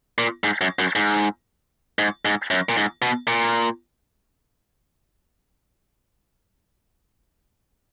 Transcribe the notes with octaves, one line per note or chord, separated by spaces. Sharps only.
A#2
G#2
F#2
F#2
G#2
G#2
G#2
F#2
A#2
G#2
B2
A#2